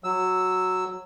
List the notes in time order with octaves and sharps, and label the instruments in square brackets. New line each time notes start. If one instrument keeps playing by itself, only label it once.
[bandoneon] F#3 E6